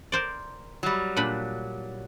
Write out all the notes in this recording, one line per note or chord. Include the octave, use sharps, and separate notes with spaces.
A#4 C5 D5
F#3 G3
A#2 D4 B5